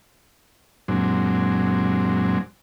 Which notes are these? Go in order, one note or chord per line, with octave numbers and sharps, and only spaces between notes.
F#2 A#2 F#3 G#3 C4 D4